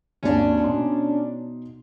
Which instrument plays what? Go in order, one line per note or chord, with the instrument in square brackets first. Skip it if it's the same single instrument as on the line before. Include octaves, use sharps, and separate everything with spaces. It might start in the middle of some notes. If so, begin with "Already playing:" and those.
[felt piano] G#1 D#2 [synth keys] C#4 D4
[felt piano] B2 D#4 C6